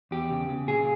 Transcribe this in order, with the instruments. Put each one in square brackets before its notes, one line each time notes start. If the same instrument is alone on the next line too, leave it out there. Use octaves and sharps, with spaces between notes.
[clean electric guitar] E2 G4
C#3
C#3
A#2 G#4